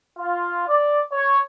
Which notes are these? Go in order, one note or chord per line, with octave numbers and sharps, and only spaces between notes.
F4
D5
C#5